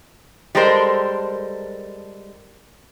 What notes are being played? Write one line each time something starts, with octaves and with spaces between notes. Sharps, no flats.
G3 G#3 A4 A#4 C5